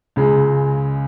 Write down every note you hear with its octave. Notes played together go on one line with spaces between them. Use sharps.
C#2 C#3 G#3